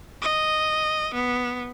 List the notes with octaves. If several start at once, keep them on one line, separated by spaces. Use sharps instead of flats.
D#5
B3